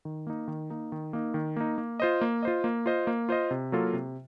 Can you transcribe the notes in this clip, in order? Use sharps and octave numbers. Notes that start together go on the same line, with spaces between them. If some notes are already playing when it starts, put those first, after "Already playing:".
D#3
A#3 D#4
D#3
A#3 D#4
D#3
A#3 D#4
D#3
A#3 D#4
A#3
F4 C5 D#5
A#3
F4 C5 D#5
A#3
F4 C5 D#5
A#3
F4 C5 D#5
C3
F#3 A#3 F4 A4
C3